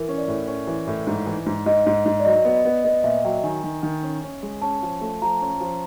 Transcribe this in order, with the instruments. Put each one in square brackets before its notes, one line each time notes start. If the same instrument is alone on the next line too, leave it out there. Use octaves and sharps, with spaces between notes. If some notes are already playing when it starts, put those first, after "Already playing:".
Already playing: [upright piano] E3 [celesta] A#4
[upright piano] C#4
[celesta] D5
[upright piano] A2
C#4
E3
A2
G#2
E3
G#2
[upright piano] G#2 [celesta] D#5
[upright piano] G#2
G#2
[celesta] D5
[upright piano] F#3 [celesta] D#5
[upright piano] B3
[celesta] D#5
[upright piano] B3
[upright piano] B3 [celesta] D#5
[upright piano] A#2 [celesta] E5
[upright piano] F#3 [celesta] G5
[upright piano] D#3 [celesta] G#5
[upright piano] D#3
D#3
C#4
C#4
G#3
[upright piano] C#4 [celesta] A5
[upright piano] F3
A3
[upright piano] F3 [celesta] A#5
[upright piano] C#4
F3